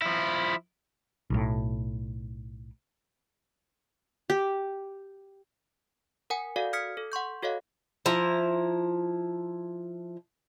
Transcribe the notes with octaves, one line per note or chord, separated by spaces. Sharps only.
F3 E4
B1 A2
G4
A#4 F#5 G#5
F#4 A4 A#4 D5 F5
D#6 F6 G#6 B6 C#7
A4
F#5 C6 C#6 G6
F#4 A4 C#5 D#5 F5
F3 E4 A#5